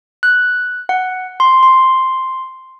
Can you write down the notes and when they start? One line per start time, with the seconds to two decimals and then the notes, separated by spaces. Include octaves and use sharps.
0.23 F#6
0.89 F#5
1.40 C6
1.63 C6